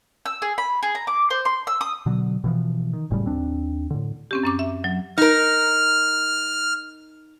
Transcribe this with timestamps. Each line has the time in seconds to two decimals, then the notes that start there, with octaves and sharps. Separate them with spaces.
0.26 E6
0.42 G#4
0.58 B5
0.83 G#4
0.95 A#5
1.07 D6
1.30 C5
1.45 C6
1.67 E6
1.81 D#6
2.06 B2 D3 F#3
2.44 B2 E3 F3
2.93 D#3
3.10 F#1 A2 C#3 G3
3.26 D#2 C4 D4
3.90 A2 D3
4.31 C4 C#4 G4
4.43 F#2 C#4 D6
4.59 E5
4.84 F#3
5.18 D#4 A#4 F6